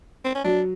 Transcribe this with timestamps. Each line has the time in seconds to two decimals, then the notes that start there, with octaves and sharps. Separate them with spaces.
0.24 C4
0.35 C#4
0.44 F#3 D4